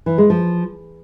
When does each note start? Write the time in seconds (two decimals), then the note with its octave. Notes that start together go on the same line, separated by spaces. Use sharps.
0.06 E3
0.18 G#3
0.30 F3